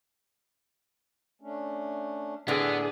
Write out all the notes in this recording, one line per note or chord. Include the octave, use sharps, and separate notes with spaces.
A3 C#4 D4
A2 D3 B3 G#4